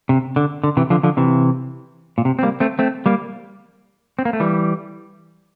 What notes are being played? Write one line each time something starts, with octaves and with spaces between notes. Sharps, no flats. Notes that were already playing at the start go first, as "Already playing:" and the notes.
C3
D3
D3
C3 E3
D3 F3
D3 F3
C3 E3
A#2
C3
C4
G3 A#3
A3 C4
A3 C4
G3 A#3
C4
A#3
A3
E3 G3